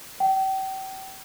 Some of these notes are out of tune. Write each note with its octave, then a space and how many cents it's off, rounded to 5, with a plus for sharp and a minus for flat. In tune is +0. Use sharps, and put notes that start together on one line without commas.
G5 -40